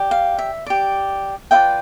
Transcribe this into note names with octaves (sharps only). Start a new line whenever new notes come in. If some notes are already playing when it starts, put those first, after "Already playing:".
Already playing: G4 D5
F5
E5
G4 D5
F4 B4 D5 E5 G5